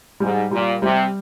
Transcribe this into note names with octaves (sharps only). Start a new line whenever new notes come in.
G#2 G3
A#2 G3
C3 G3